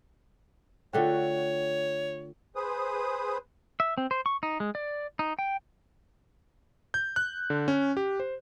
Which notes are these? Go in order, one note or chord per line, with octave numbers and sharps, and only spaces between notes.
D3 A3 F4 F#4 C#5 G5
G#4 B4 C5 D#6
E5
C4
C5
C#6
D#4
G#3
D5
D#4
G5
G6
F#6
D3
C#4
G4
C5